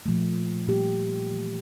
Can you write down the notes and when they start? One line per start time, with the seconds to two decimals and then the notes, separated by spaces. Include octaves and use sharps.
0.06 A#2 F3 A3
0.68 A#2 G3 A#3 G4
1.31 E3 A3